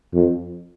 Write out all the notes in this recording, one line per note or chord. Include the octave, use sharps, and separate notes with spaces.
F2